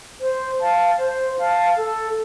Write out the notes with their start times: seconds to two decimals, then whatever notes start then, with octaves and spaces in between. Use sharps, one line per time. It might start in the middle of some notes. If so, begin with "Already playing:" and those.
0.20 C5
0.59 F5 A5
0.98 C5
1.38 F5 A5
1.77 A4